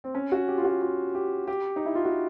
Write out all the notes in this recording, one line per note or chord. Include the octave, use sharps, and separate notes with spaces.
C4
C#4
F#4
G4
F4
F#4
F4
G4
G4
D#4
E4
F4
F#4